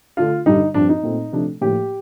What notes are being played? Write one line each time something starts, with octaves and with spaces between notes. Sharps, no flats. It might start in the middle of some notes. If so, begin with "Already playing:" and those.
D3 A3 D4 F4
G2 D3 G3 D4 D#4
G2 F3 C4 D4
D#4
A#2 A3 C4
C3 F3 A3 D4
A2 F3 A#3 G4